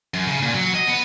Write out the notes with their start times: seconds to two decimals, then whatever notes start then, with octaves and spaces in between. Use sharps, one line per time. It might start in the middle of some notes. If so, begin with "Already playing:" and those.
0.14 F#2
0.28 C#3
0.43 A#2
0.55 F#3
0.75 D#5
0.88 B3